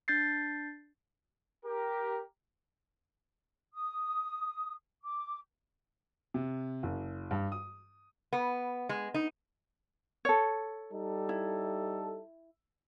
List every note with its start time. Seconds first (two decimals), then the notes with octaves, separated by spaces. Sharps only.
0.08 D4 G6 A6 C7
1.64 G4 A#4
3.72 D#6
5.03 D6
6.34 C3
6.83 F#1
7.31 G2
7.52 D#6
8.33 B3
8.89 G#3
9.14 D#4
10.25 A4 C#5
10.92 G3 D#4 A4
11.29 E4